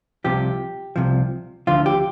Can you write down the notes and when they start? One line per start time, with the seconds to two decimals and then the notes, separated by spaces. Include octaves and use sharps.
0.24 C2 C3 F3 G4
0.96 C2 C3 F3
1.67 D2 D3 F3 F4
1.86 G4